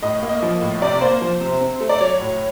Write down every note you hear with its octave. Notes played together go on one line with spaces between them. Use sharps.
A2 D#5
A#3
D#5
F3
A2
C3 D5
A#3 C5
F3
C3
C4
A3
D5
F#3 C#5
A2